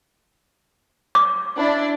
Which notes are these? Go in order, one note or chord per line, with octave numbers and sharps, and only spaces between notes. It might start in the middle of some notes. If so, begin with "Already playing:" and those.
D6
D4 E4 D5